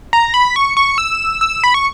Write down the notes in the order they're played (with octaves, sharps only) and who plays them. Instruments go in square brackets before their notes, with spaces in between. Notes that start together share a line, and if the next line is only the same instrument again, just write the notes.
[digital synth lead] A#5
B5
C#6
C#6
E6
E6
B5
C#6